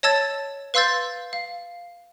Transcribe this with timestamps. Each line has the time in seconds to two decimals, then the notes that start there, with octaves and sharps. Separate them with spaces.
0.03 C#5 D#5 A5 E6 G#6 A6
0.74 B4 F5 C6 E6 G6 A6
1.33 F5